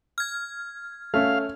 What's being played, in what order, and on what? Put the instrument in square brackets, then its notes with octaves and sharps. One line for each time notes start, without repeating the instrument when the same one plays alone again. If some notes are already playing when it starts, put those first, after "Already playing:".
[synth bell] F6 G#6
[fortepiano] A3 C#4 [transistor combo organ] F5